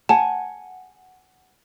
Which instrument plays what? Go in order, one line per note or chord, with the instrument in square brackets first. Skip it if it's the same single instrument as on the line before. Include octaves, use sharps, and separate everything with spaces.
[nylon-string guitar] F#5 G#5 [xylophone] A5